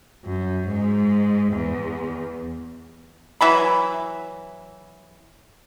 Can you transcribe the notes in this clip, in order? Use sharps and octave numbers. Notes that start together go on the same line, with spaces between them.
F#2
G#2
E2
E3 F#3 B5